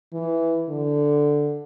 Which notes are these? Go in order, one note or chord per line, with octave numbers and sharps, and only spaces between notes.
E3
D3